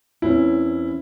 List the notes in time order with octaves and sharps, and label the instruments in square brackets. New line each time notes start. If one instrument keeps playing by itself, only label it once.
[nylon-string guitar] E2 C4 C#4 [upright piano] E4